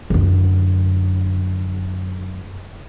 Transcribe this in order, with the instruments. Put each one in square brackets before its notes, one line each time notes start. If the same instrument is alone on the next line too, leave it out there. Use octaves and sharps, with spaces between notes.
[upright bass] F#2 D3